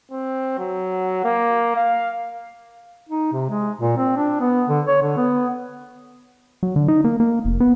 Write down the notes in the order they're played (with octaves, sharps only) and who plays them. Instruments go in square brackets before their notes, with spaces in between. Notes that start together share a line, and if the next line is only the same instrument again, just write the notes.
[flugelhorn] C4
F#3
A#3
F5
[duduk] D#4
C3
G#3
A#2
C4
D4
B3
D3
C#5
D3
B3
[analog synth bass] F#3
D3
D#4
A#3
A#3
F1
B3